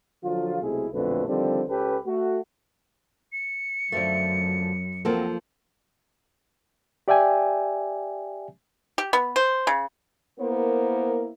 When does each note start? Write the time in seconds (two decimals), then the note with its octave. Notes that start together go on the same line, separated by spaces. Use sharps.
0.24 D3 F3 F#3 F4
0.61 B1 C3 G#3 A3 E4 G#4
0.93 B1 F2 A#2 D3 A3 B4
1.28 D3 D#3 F3 G3 C4
1.69 C#2 C#4 G4 A4 B4
2.06 A3 F#4
3.32 C#7
3.92 F#2 D3 F3 A3
5.05 F3 F#3 A#3 C4 A4 A#4
7.08 G4 D5 E5 G5 G#5
8.98 G4
9.13 B3
9.36 C5
9.67 C#3
10.39 A#3 B3 E4 A#4 C5